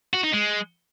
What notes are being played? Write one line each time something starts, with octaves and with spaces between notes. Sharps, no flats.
F#4
D#4
G#3